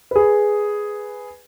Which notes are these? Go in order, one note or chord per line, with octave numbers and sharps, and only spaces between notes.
G#4 B4